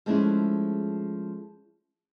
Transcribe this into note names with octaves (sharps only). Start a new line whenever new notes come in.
F3 G#3 A3 C#4 D4 E4